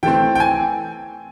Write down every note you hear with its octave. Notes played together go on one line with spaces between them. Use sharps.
E3 A3 C4 G5
G5
G#5